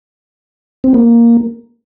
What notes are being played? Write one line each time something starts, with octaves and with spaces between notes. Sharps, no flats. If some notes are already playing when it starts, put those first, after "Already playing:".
C4
A#3